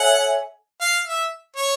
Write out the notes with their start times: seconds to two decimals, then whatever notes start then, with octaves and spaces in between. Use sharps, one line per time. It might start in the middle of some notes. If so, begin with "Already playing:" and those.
Already playing: A4 C#5 E5 F#5 G#5
0.81 F5
1.07 E5
1.57 C#5